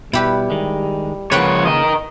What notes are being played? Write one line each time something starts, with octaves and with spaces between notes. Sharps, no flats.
B2 G3 E4 G4 B4
D#3 G#3
C#3 F3 A#3 B4 C#5 F#5 G5
A#4 D#5